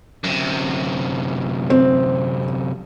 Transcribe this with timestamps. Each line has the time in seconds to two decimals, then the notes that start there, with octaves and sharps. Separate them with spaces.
0.24 F#2 C3
1.70 C4